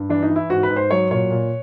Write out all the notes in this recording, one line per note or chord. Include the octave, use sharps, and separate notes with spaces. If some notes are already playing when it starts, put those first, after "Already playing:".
Already playing: G2
E3 D4
D#4
E3
E4
G#2 F#4
B4
G#2
C5
F#3 C#5
A#2 C#5
A#2